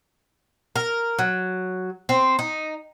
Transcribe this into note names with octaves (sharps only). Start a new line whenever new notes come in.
A#4
F#3
C4
D#4